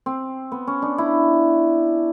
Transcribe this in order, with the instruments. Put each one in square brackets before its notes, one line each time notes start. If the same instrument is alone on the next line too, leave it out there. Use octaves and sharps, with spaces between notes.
[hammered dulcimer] C4
B3
C#4
D4
E4